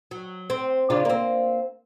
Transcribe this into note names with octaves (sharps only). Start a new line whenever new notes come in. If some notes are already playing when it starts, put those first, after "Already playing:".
F#3
C4
C#3 D4 F4
A#3 C4